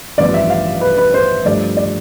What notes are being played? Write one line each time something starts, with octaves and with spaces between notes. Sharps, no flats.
A1 G2 F3 B3 D5
E5
F5
B4
B4
C5
G2 F3 A3 D5
D5